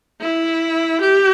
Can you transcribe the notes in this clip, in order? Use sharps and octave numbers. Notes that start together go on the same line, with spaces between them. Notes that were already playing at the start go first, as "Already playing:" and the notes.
E4
G4